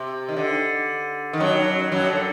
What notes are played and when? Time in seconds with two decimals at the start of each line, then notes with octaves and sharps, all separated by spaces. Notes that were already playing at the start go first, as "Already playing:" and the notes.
Already playing: C3
0.29 D#3
0.36 D3
1.33 D#3
1.40 F#2 F#3
1.92 F#2 F#3
2.10 D3